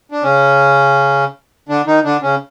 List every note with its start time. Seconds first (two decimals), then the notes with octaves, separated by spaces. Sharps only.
0.12 D4
0.23 C#3 C#4
1.69 D3 D4
1.87 D#3 D#4
2.04 D3 D4
2.23 C#3 C#4